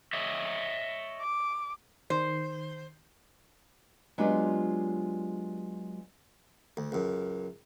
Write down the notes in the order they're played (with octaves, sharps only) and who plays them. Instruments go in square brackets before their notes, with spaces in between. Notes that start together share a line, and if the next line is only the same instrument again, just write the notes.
[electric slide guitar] C#5 D#5 E5
[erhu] D6
[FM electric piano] D#3 [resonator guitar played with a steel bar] C5
[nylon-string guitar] F#3 G#3 B3 D4 F4 G4
[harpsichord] D2
C#2 F#2